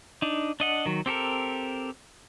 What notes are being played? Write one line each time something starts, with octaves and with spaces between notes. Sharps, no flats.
D4 D#4
D4 D#5 F#5
D#3 F#3
C4 G4 A4 A#4